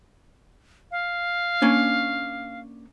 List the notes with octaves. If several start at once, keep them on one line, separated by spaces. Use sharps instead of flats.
F5
A#3 C#4 D4